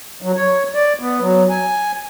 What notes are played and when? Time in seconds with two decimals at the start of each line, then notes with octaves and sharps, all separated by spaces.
0.22 F#3
0.36 C#5
0.75 D5
0.99 B3
1.20 F#3
1.50 G#5